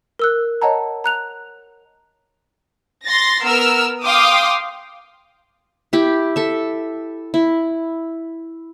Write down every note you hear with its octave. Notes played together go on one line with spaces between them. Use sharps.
A#4 E6 F#6
C#5 D#5 F#5 A5 A#5
A#5 F#6 F7
C6 A6 A#6
B3 A#4 E6 F6
F5 G5 C6 D6 D#6
E4 G4
A4 E5
E4